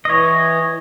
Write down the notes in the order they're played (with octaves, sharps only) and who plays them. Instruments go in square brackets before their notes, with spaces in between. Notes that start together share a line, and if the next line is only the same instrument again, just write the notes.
[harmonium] E3 [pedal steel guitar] C#5 D#5